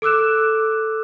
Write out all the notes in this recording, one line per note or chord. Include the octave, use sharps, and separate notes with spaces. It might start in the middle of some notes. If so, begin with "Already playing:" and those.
A4 D6 E6 F#6 E7